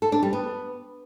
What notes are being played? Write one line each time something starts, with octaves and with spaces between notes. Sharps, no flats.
A4
D4
G3
B3